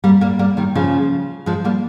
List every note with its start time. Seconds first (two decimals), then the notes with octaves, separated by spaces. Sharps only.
0.04 G3 A#3
0.21 G3 A#3
0.39 G3 A#3
0.57 D#3 G3
0.75 C#3 F3
1.46 F3 G#3
1.65 G3 A#3